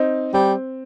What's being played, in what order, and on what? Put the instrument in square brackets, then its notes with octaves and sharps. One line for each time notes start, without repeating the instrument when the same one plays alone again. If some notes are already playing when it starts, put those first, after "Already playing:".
Already playing: [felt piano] C4 D#4
[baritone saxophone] G3 [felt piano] C4